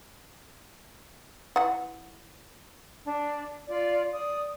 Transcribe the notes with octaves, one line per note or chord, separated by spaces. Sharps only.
E3 F#5
D4
F4 D5
D5 D#6